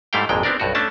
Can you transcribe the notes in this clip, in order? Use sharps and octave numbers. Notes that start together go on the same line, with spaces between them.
G#2 G3 A3 E4 F5 G5
G#1 F2 A#2 G#3 G5
B3 C4 D4 A#4 D5
B1 G2 F#4
A3 C#4 D4 A5